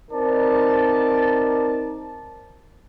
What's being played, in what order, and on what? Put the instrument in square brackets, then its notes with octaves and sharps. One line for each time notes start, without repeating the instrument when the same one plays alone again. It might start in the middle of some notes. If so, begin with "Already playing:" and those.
[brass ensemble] C4 D#4 A#4 D5 A5